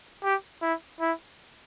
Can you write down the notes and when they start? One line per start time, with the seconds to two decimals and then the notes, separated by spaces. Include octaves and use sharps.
0.23 G4
0.62 E4
1.01 E4